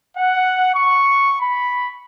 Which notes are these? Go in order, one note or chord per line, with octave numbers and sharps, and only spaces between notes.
F#5
C#6
B5